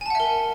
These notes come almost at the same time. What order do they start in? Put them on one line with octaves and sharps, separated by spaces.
G#5 A5 F#5 E5 A#4